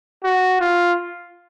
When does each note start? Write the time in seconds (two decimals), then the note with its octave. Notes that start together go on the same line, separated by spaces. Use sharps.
0.24 F#4
0.60 F4